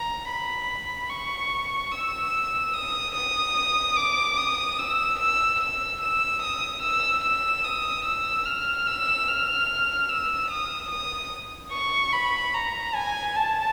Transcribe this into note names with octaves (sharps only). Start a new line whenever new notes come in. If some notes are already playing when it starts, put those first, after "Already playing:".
Already playing: A#5
B5
C#6
E6
D#6
D#6
D6
D#6
E6
E6
E6
E6
D#6
E6
E6
D#6
E6
F6
E6
F6
E6
D#6
D#6
C#6
B5
A#5
G#5
A5